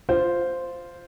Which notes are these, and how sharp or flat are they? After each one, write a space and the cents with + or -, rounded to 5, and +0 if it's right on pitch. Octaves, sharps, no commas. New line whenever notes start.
F4 +0 C5 -5